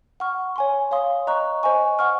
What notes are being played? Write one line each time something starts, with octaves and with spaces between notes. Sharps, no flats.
F#5 C#6 F6
C#5 G#5 C6
C#5 F5 C6 D#6
D#5 A#5 C#6 F#6
C5 D#5 G#5 C#6
F#5 C#6 F6